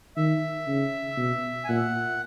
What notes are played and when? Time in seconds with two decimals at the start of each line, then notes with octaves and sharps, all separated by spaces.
0.16 D#3 E5
0.67 C#3
1.17 B2
1.64 G#5
1.68 A#2 F#5